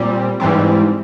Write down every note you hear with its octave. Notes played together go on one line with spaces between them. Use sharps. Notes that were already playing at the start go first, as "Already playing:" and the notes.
Already playing: A#2 G3 C4
G#2 E3 G3 C4